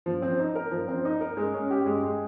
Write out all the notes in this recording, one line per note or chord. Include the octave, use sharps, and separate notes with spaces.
F3
C4
D#4
A#4
F3
C4
D#4
A#4
G#3
C#4
G4
G#3
G#3